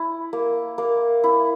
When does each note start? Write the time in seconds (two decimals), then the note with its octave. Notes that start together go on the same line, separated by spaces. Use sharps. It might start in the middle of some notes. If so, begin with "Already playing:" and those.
Already playing: E4
0.33 A#3
0.78 A#3
1.24 E4